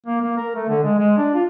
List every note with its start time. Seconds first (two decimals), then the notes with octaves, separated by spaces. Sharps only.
0.06 A#3
0.21 A#3
0.37 A#4
0.55 A3
0.68 D3
0.83 G#3
0.98 G#3
1.17 D4
1.34 F4